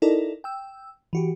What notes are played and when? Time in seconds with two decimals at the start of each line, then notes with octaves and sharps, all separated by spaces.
0.02 D#4 E4 A4 A#4 D5 D#5
0.44 G5 E6
1.13 E3 F#4 G4